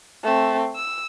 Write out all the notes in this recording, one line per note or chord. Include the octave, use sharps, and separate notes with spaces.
A3 C4
E6